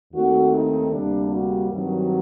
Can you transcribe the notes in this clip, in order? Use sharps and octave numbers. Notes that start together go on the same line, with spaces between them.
D#2 D#3 A3 C4 F#4
D#4
D2 C3 G3 A#3 D4
F#4
G2 D#3 F#3 C4